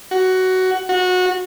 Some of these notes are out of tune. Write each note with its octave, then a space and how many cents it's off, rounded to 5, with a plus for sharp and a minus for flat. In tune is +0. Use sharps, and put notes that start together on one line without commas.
F#4 +15
F#4 -20